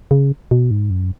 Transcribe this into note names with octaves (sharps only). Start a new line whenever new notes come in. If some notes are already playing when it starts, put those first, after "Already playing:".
C#3
B2
G#2
F#2